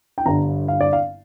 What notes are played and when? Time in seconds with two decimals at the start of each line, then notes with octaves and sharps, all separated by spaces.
0.18 G5
0.26 G1 G2 D3 A#5
0.68 F5
0.81 D5
0.93 F5